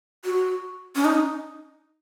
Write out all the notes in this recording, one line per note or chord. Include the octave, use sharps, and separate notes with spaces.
F#4
C#4
D#4